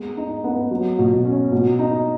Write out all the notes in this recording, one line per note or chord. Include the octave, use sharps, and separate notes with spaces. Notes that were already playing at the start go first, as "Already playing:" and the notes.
Already playing: G#3 B3
D#4
B3
F#3
B2
C#4
B2
D#4